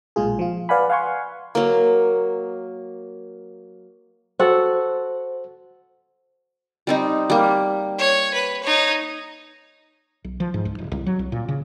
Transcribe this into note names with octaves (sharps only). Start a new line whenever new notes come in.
B1 A#2 G#3 F4 G#4
F3 F4
B4 D5 F5 F#5 G#5 B5
F5 F#5 G#5 C6 C#6
F#3 A#3
F#4 A4 C5 F#5
G3 C4 D#4
G3 A#3
C#5
B4
D#4 C#5
B1
F3
G#2
C#2
D1
C2
F#3
C2
A#2
C#3